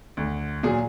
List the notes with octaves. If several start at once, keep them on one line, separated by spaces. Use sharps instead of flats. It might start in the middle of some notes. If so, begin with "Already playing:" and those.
D2
A#2 F#3 G#4